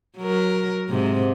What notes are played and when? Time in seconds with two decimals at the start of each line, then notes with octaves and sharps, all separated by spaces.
0.17 F#3 A#4
0.89 G#2 C3